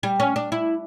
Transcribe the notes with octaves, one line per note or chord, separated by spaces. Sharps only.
G3
C#4
D4
E4